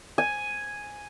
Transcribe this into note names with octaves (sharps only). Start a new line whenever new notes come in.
G#5